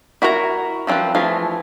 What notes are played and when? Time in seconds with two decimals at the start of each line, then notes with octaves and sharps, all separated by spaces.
0.22 E4 F#4 A#4 B4 A#5
0.87 F3 C4 E4 F4 B4
1.15 E3 F3 A3 F4 G#4